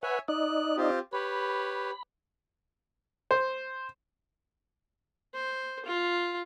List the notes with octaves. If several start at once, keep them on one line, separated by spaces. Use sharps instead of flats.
B4 C#5 E5 F#5 G#5
D#4 D5 D#5 F#6
C4 F4 G4
G4 B4 C#5 B5
C5
C5
F4